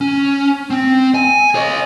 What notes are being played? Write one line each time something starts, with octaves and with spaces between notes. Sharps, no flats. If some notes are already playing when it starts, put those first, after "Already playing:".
C#4
C4
G#5
C#5 D#5